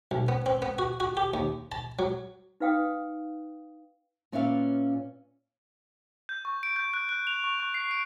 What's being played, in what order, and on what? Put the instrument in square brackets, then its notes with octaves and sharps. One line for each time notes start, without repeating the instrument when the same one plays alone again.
[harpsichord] B1
B3
C4
B3
F#4
F#4
G4
D#2
A5
F#3
[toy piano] D#4 B4 F5 G5 D#6
[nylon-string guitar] A#2 C#4 B4 D5 E5 F5
[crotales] G6
C#6
D7
G6
F#6
F#6
F7
C#6
C#6
C7
D7